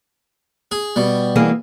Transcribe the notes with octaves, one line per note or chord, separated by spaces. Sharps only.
G#4
B2 G3
E3 A#3 G#4